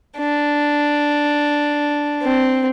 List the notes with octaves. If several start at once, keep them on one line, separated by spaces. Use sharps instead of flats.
D4
C4